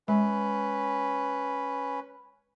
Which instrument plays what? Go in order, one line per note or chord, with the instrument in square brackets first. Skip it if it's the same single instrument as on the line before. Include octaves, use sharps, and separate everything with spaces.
[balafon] G#3 [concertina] C#4 B4